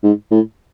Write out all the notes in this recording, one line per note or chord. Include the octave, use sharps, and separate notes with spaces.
G#2
A2